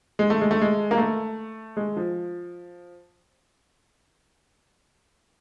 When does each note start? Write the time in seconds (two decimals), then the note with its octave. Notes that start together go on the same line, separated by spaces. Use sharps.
0.19 G#3
0.30 A3
0.41 G#3
0.51 A3
0.61 G#3
0.91 A#3
0.98 A3
1.77 G#3
1.97 F3